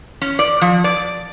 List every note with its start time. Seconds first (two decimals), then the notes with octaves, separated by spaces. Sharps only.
0.22 C#4
0.39 D5
0.61 F3
0.84 D5